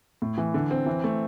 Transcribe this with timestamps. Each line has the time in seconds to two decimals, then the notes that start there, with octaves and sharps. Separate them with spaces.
0.22 A2
0.38 E3
0.54 D3
0.71 C4
0.86 E3
1.04 A3